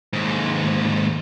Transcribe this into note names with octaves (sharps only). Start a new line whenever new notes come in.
D#2 G#2